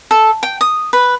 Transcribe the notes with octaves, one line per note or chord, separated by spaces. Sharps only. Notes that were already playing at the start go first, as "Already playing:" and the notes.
A4
G5
D#6
B4